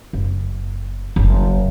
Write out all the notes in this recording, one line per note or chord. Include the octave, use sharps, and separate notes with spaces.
F#1
F#1 C#3